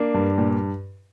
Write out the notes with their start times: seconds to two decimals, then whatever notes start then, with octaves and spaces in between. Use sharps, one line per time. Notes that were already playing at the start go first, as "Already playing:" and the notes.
Already playing: A#3 D4
0.14 G2
0.38 A#2